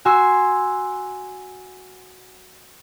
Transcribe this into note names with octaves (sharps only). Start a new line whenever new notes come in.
F#4 G#5 C6 E6